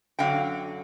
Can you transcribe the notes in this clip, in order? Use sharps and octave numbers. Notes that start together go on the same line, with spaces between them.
F#2 D3 F#3 F5 G5